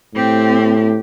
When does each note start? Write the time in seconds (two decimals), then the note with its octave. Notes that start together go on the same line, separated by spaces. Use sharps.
0.15 A2 C4 G4